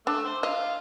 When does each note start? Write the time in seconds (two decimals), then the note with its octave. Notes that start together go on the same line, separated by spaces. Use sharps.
0.07 A3 D4 E6
0.25 C5
0.43 F4 D#5 F5